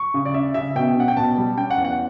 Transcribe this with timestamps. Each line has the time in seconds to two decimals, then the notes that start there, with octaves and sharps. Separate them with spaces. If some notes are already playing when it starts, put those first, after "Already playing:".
Already playing: C#6
0.14 C#3
0.25 D5
0.34 C#4 E5
0.54 C#3 E5
0.76 B2 G5
0.96 C#4 F#5
1.08 G5
1.17 B2 A5
1.38 G3
1.57 C#4 G5
1.71 F#5
1.77 E2
1.85 F#5